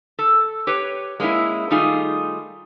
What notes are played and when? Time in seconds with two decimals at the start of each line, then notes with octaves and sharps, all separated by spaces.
0.19 A4
0.67 G4 B4 C#5
1.20 G#3 A#3 C#4 D4 E4
1.70 D#3 G3 A3 D#4 F4 G#4